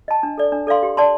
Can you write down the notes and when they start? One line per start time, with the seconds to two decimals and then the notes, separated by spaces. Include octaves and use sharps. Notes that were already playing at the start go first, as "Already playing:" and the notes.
0.08 D#5 A5
0.23 D4
0.38 A4 D5
0.52 D4
0.67 A4 D5 F5 C6
0.83 G4
0.97 D5 A5 C6